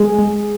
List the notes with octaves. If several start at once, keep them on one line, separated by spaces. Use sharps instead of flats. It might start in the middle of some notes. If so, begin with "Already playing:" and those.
Already playing: G#3 G#4
G#3